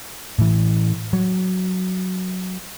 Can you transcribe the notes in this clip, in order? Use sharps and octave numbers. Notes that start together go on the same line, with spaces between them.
A2 E3
F#3